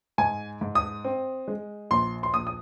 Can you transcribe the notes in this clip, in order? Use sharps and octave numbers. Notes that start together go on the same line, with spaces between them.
G#2 G#5
G#2
D#6
C4
G#3
A#1 C6
C6
A#1 D#6
D#6